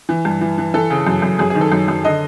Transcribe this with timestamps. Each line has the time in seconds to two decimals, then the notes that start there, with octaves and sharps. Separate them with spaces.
0.09 E3
0.25 G2
0.41 E3
0.58 E3
0.74 E3 A4
0.90 C#3
1.06 F#2
1.22 F#2
1.39 F#2 G#4
1.50 D#3 G#4
1.61 A4
1.72 F#2
1.88 F#2
2.04 D3 D#5